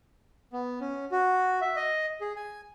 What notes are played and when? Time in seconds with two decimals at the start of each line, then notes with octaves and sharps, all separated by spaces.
0.53 B3
0.81 C#4
1.11 F#4
1.61 E5
1.76 D#5
2.21 G#4
2.36 G#5